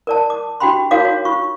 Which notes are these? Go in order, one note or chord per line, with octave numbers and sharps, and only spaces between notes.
A#4 D5 A5
D6
D4 F#4 G4 G5 B5 C6
D#4 F#4 A#4 C#5 F5 D6
F#4 C#5
F4 C#6